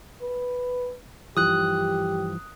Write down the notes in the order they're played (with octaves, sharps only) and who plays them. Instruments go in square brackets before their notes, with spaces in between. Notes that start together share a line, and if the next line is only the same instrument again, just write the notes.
[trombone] B4
[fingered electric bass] G2 E3 F3 [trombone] G4 [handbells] D#6 F#6